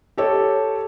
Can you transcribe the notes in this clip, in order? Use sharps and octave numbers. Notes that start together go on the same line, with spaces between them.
G4 A4 C#5